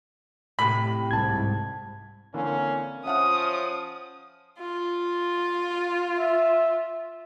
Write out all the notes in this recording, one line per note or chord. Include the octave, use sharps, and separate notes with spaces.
A2 C3 B5
C2 G#2 A5 G#6
D3 E3 A#3 C4 C#4
F3 C#4 E5 F#5 D#6 F6
F4
E5